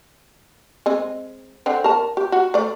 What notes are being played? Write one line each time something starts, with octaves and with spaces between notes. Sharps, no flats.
G#3 C4 D#5
D3 C4 G5
A#4 A5
G4
F#4
A3 D5